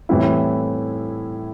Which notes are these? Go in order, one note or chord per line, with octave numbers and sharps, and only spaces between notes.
A2 E3 G3 C4 E4